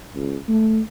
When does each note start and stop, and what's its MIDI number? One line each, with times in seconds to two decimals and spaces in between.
0.15 0.36 37
0.48 0.80 57